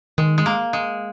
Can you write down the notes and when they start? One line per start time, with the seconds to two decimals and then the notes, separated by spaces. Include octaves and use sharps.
0.18 D#3 G#3
0.38 G#3
0.46 A#3
0.73 G#3